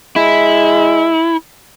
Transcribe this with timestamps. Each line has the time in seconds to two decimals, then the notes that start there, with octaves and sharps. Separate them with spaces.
0.16 G#3 E4